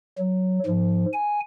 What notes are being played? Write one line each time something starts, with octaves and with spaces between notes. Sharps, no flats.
F#3
G#2 F3
G#5